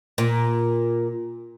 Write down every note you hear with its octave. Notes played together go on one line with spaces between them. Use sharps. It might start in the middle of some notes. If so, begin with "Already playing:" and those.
A#2